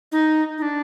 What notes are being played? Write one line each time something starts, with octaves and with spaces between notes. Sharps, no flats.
D#4
D#4
D4